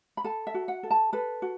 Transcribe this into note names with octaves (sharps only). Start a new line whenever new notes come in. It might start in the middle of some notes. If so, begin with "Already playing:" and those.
B5
A4 A5
E5
F#4
F#5
A4
A5
A4 B4
F#4